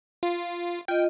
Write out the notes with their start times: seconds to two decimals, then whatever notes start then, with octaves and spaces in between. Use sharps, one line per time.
0.23 F4
0.88 F4 D#5 G5